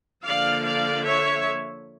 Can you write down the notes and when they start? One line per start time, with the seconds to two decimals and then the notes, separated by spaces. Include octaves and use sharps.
0.24 D3 F3 A#3 D5 F5
0.63 D5 F5
1.03 C#5 E5